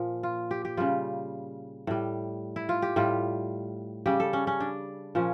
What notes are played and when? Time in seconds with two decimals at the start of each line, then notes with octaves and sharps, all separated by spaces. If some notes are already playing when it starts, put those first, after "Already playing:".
Already playing: A#2 F3
0.23 F4
0.51 G4
0.65 G4
0.77 C#3 G3 F4
1.87 A2 G3
2.56 E4
2.69 F4
2.82 G4
2.96 A2 G3 F4
4.06 C#3 G3 G4
4.20 A4
4.33 C#4
4.47 C#4
4.60 D4
5.15 A#2 F3 C#4